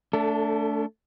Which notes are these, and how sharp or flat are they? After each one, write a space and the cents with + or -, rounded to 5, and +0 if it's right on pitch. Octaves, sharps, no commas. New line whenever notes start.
A3 +0 D4 -30 A4 +30